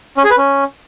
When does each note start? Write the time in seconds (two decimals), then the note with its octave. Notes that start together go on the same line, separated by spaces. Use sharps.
0.17 C#4
0.24 G#4
0.31 B4
0.37 C#4